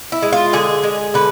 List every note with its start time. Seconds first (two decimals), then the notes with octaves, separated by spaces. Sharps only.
0.12 E4
0.22 G#3
0.32 F4
0.53 D3 G#4
0.83 G#3
1.14 D3 B4